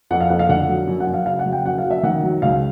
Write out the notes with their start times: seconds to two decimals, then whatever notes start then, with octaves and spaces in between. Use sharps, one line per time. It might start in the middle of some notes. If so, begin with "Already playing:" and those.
0.10 F2 F#5
0.21 F5
0.29 F2 F#5
0.39 F5
0.49 D3 F#5
0.69 F#3
0.87 F#2
1.00 F#5
1.07 F#2
1.14 F5
1.26 C#3 F5
1.39 F#5
1.46 F#3
1.52 G5
1.66 F#2 F#5
1.78 F5
1.84 F#2
1.91 E5
2.03 D#3 F#5
2.23 F#3
2.42 C#2 F5